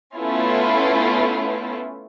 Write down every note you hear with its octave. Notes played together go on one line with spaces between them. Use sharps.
A3 B3 C#4 E4 F4